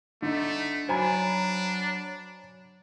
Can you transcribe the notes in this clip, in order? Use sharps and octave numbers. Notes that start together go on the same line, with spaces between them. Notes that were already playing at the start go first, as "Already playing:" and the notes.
D3 A3 D#4
F#3 D4 F#4 C5 G#5 A#5 B5